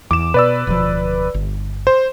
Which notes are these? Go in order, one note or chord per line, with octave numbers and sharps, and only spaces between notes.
E2 D6 E7
B2 B4 D5 E6
D1 B2 F3
G1
C5